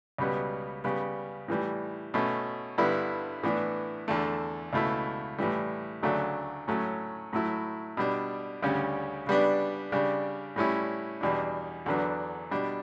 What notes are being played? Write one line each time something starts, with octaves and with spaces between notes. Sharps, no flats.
C#2 B2 G3 B3
C#3 G3 B3
A2 E3 G3
B2 A3 C#4
G2 D3 G3 B3 E4
A2 E3 B3 D4
E2 D3 A3
C#2 B2 A3 E4
A2 E3 G3
D2 C#3 F#3 A3 D4
A2 F#3 A3 C#4
A2 F#3 A3 E4
B2 G3 D4
D2 C#3 G3 C#4
C#3 G3 B3 D4
C#3 G3 D4
A2 G3 C#4 E4
E2 B2 G3 D4
E2 D3 F#3 B3 D4
B2 G3 D4